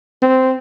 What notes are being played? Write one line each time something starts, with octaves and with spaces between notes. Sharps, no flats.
C4